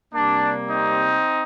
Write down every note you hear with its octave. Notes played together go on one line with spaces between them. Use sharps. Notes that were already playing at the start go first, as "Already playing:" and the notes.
C3 G3 A#3 D4
C4 D#4